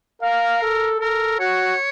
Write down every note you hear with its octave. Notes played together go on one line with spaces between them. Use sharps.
A#4 F5
A4
A4 A#4
F#4 C#5